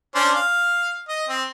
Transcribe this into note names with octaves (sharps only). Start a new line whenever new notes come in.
C#4 D4 C5
F5
D#5
C4